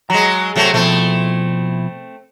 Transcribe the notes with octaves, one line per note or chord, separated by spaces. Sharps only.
F#3 G#3 A#5
C3 F#3 A3
B2 F3 A3 C4 E4